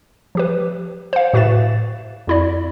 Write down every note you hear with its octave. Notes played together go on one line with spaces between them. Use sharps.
F3 G4 B4
C5 F5
A2 F#4 B4 E5 A6 E7
F2 E4 D5